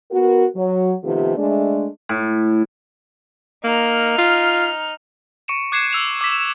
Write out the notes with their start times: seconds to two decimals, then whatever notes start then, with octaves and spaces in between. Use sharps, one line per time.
0.11 B3 F#4 A#4
0.55 F#3
1.02 C3 D#3 F3 A3 B3 G4
1.37 G#3 A3 D4
2.09 A2
3.64 A#3 D#4 F6
4.18 F4
5.48 C#6 C#7 D7 E7
5.72 D6 F#6 G#6 C7 C#7 E7
5.93 E6 F7
6.21 D6 B6